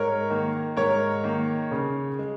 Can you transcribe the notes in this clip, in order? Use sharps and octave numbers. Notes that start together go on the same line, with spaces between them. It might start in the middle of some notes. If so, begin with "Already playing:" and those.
Already playing: G#2 A#4 C#5
D#3 A#3
G#2 A#4 C#5
D#3 A#3
C#3
G#3